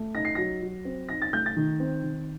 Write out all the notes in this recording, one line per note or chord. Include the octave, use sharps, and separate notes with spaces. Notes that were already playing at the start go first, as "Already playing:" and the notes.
Already playing: A3
D#4 A#6
C7
F#3 A#6
F#3
C4
D#4 A#6
A6
A3 G6
A6
D#3
C4
D#3